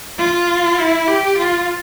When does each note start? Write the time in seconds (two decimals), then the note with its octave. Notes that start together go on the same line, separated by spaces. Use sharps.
0.19 F4
0.78 E4
1.08 G4
1.38 F4